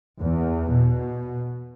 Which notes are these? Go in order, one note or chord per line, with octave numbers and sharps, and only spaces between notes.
E2
B2